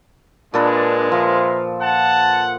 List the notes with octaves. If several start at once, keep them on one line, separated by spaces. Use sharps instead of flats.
A#2 G#3 D4 A4 B4
F3 A#4 E5 F5
F#5 A5